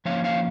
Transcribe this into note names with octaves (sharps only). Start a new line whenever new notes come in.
F3 A#3 C#4 C#5 F5
C#5 F5